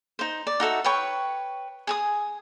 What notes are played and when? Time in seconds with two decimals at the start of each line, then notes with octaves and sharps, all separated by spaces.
0.19 D#4 C5
0.47 D5
0.60 D#4 F#4 A4 E5
0.84 B4 C#5 G5 C#6
1.87 G#4 G#5 D#6